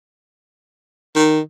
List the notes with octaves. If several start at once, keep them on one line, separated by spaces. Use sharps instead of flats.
D#3